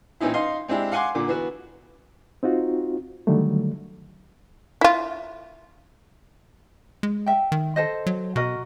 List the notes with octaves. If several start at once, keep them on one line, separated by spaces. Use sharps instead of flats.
A#2 E3 C4 C#4 D#4 E4
D#4 D#5 F5 C6
G#3 C4 D4 E4 G4
F5 F#5 G#5 C6 D6
A#2 D3 D6
E3 B3 F#4
C4 D#4 F4 F#4
D3 D#3 F#3 G3 A3
E4 F4
G#3
E5 G5
D#3
A4 C5 D#5
F#3
B2 F#4 A#4 D#5